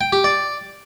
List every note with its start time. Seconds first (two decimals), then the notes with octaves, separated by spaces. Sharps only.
0.01 G5
0.12 G4
0.24 D5